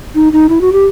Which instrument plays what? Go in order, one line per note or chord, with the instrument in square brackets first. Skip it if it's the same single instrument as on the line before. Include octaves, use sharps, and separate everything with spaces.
[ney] D#4
D#4
E4
F#4
G4